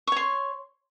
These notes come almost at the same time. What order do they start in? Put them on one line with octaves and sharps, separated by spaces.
C#6 C#5 C6